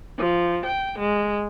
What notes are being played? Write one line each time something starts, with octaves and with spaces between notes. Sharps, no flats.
F3
G5
G#3